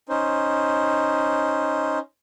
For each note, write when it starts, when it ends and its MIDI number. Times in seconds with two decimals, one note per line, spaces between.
0.09 1.99 61
0.09 1.99 63
0.09 1.99 72